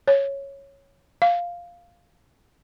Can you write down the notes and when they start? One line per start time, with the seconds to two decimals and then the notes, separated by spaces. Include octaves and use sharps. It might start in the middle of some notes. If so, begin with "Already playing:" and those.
0.08 C#5
1.22 F5